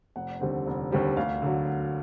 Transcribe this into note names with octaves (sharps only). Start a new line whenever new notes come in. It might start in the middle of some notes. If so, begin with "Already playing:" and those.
F1 F#5
D#2 D3 G3 C4
F1
D#2 D3 G3 C4
D2 F5
D3 F#3